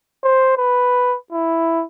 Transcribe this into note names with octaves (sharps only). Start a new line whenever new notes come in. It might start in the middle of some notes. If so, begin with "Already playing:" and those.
C5
B4
E4